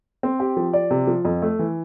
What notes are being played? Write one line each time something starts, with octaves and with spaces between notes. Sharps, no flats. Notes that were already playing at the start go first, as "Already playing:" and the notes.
C4
G4
F3
D5
C3
F3
F2
A3
E3